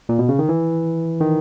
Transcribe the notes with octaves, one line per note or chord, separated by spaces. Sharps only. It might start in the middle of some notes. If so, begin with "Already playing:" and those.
A#2
B2
C#3
D#3
E3
D#3